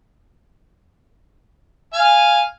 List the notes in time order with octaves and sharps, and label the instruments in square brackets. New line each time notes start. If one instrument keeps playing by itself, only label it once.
[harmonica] F5 [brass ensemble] G#5